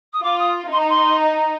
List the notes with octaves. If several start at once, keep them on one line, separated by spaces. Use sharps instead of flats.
D#6
F4 D6
D#6
D#4 C6
A#5
C6
A#5
A#5